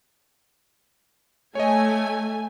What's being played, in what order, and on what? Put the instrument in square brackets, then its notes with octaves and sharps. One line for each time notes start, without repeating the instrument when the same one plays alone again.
[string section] A3 G#5 [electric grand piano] C#5 D#5